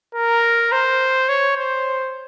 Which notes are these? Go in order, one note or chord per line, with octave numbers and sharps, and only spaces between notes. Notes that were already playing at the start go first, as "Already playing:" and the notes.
A#4
C5
C#5
C5